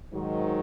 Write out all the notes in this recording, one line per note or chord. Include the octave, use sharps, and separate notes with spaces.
G#2 D#3 F#3